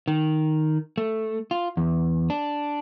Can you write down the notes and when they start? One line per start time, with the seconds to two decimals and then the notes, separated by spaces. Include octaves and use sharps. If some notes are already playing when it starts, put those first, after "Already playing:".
0.08 D#3
0.98 A3
1.51 F4
1.77 E2
2.30 D4